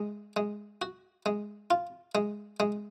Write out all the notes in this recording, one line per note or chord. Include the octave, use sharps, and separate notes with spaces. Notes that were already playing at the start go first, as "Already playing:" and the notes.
Already playing: G#3
G#3
F#4
G#3
F4
G#3
G#3